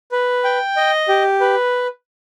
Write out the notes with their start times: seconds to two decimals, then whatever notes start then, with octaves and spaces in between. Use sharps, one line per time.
0.12 B4
0.44 G5
0.77 D#5
1.08 G4
1.41 B4